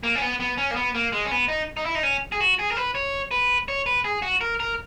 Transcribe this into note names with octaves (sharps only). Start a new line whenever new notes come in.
A#3
C#4
B3
B3
C#4
A#3
B3
A#3
G#3
C#4
B3
D#4
D#4
E4
D#4
C#4
G#4
F#4
G#4
A#4
B4
C#5
B4
C#5
B4
G#4
F#4
A#4
A#4